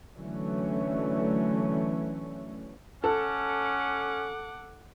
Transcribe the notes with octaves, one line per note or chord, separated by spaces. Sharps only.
D3 E3 F#3 A3 C#4
C#4 A4 F#5 D6